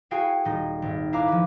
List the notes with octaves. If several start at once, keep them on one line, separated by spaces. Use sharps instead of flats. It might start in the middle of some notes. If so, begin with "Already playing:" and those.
E4 F#4 G#4 F5 G5 G#5
D#1 D#4
G#1
E4 B4 F5 A#5 D6
F3 B4